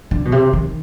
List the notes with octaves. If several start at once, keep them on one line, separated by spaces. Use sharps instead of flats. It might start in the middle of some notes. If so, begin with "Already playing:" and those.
D3
B2
C3
D#3